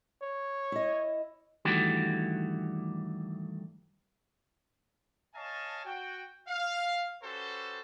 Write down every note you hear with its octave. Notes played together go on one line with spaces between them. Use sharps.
C#5
E4 D#5
G2 D#3 E3 A3 F#4 G4
C#5 D#5 F5 G#5 A5
F#4 G5
F5
C#4 F#4 G4 A4 B4 C5